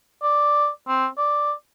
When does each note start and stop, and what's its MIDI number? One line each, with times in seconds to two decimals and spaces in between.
0.23 0.68 74
0.88 1.06 60
1.18 1.52 74